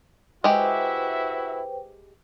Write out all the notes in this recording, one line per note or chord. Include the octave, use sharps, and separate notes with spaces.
G#3 E4 F#4 G4 B4 C5 E5 G5